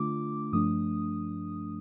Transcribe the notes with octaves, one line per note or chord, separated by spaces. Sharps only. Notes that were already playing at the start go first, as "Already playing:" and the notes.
Already playing: D3 A3 D4 F4 D6
G2 F3 A3 D4 D#6